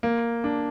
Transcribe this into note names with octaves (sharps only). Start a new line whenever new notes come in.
A#3
D4